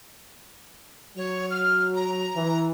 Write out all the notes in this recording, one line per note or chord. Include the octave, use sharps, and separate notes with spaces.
F#3 C#5
F6
A#5
E3